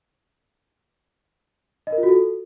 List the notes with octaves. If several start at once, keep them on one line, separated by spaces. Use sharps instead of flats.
D#5
A#4
F4
F#4
A4